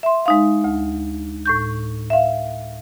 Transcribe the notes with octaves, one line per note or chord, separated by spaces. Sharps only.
E5 C6
G#3 D#4 F5
D2
A2 C#6 G6
E5 F5